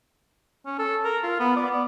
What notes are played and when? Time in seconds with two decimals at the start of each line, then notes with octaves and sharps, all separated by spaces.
0.66 C#4
0.79 A4
1.05 A#4
1.23 F4
1.40 B3
1.56 D5
1.71 B3